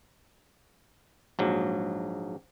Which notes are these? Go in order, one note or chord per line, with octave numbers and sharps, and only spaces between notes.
A#1 G#2 F#3